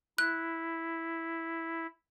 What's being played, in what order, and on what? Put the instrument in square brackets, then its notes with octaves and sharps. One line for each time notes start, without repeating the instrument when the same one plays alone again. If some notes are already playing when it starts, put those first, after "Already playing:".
[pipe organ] E4 [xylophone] F#6